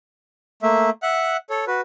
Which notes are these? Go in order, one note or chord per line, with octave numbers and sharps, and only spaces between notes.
A3 A#3 E5
E5 F#5 F#6
A4 C#5
F#4 B4